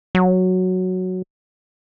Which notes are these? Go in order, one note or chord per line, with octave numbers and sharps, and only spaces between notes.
F#3